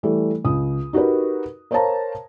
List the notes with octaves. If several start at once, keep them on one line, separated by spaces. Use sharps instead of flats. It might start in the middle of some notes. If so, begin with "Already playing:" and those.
E3 G3 A3
C#2 D#6
D#4 F#4 G4 A#4 B4
A#4 C5 C#5 F5 A5 A#5